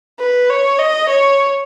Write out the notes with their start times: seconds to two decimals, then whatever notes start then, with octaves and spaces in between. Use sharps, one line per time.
0.20 B4
0.50 C#5
0.79 D#5
1.09 C#5